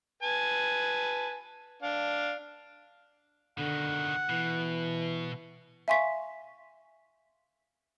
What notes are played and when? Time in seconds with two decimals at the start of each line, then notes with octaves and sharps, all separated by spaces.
0.23 B4 G#5 A5
1.82 D4 F5
3.58 B2 D3 D#3 F#5
4.29 B2 E3
5.88 E5 F5 G#5 C6 C#6 B6